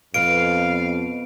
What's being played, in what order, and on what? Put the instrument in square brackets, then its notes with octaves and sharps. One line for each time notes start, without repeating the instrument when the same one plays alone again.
[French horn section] F2 [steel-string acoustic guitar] B2 [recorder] F5 [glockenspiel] D7